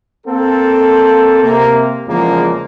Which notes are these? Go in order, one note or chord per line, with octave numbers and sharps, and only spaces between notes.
A#3 C4 A4
C3 A#3
E2 C#3 F3 G#3 A#3